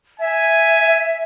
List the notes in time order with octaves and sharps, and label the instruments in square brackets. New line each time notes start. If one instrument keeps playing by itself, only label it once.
[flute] E5 [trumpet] G#5